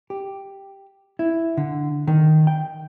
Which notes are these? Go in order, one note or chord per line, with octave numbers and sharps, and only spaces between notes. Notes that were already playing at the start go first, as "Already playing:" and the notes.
G4
E4
D3
D#3
G5